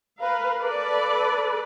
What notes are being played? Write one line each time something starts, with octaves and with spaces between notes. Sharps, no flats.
A#4 B4 F5
A4 B4 D5